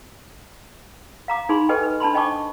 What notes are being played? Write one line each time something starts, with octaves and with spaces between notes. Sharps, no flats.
F5 A#5 D6
D#4 G#4 B5 C6
G4 A4 B4 D#5 G5 G#5
B4
D4 A5 B5 C6
C5 D#5 G5 A5 C#6 D6